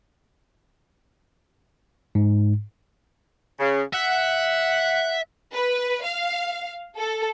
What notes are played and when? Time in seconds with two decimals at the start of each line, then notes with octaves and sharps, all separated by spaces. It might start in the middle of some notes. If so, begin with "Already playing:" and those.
2.15 G#2
3.59 C#3
3.94 E5 F#5
5.53 B4
6.04 F5
6.98 A4